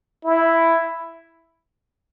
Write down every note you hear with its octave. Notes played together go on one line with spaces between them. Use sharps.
E4